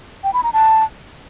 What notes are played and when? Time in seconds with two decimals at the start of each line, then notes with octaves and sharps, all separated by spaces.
0.24 G5
0.34 B5
0.43 A#5
0.53 A5